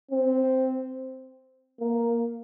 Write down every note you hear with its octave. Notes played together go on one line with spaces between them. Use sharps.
C4
A#3